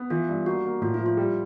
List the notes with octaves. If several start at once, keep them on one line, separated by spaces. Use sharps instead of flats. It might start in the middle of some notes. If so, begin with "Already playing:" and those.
Already playing: B3
E3 F4
G2
A#3 F#4
A#3
A2 F4
E4
F3
F4
G3